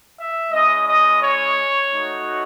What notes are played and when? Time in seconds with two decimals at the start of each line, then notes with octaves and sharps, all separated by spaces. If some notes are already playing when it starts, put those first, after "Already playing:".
0.16 E5
0.51 G#3 C#4 E4 D#5
0.86 D#5
1.21 C#5
1.91 A3 D#4 F#4